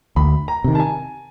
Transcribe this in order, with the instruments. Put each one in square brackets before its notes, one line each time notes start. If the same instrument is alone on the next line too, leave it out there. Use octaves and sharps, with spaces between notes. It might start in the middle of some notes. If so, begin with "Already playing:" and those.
[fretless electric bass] D2 [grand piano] B5
[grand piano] A#5
[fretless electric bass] C3 D#3
[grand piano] A5
G#5